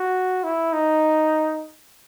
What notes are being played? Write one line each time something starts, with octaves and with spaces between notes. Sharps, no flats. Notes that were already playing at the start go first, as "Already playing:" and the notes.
Already playing: F#4
E4
D#4